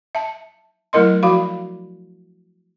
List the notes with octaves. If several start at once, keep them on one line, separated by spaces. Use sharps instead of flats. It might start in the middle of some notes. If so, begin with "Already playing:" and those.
E5 A5
F#3 A3 E4 A#4 D#5 C6
F3 F#4 F5 B5